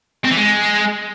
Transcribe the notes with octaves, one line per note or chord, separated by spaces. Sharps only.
C4
E3
G#3